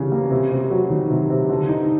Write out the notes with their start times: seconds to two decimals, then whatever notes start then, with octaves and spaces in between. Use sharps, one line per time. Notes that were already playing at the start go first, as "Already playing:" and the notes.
Already playing: C#3 E3 G3
0.12 A#3
0.30 C3
0.51 C3
0.70 F#3
0.90 D#3
1.10 C3
1.30 C3
1.49 D3
1.69 D#4